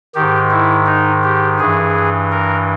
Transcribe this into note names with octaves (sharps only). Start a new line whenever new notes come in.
G#2 D#3 G4
E4
D#4
G4
G2 E3 G#4
A#4